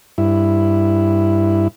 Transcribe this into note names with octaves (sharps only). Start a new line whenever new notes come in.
G2 E4